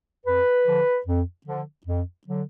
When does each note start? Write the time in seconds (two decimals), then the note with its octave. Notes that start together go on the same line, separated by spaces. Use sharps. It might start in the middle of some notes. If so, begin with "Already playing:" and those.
0.25 F2 B4
0.66 D3 F3
1.06 F2
1.46 D3 F3
1.86 F2
2.27 D3 F#3